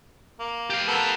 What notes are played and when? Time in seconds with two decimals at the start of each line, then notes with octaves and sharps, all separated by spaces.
0.39 A#3
0.70 G4 F5
0.87 B3 A4 A#4